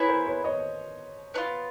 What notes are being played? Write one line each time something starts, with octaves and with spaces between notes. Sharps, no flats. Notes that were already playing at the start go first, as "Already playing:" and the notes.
Already playing: B3 E4 G#4 B4 C#5
A#4 C5
B4 C#5
C#5 D#5
B3 D4 F4